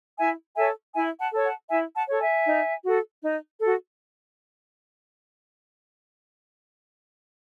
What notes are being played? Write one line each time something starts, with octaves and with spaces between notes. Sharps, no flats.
E4 E5 G#5
A4 C#5 E5 G#5
E4 E5 G#5
F#5 A5
A4 C#5
F#5 A5
E4 E5 G#5
F#5 A5
A4 C#5
E5 G#5
D#4
F#4 A4
D#4
F#4 A4